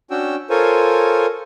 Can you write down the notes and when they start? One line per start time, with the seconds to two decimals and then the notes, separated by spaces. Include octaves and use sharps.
0.11 C#4 D4 F#4 G5 E6
0.50 F4 A4 A#4 C5 C#5 G#5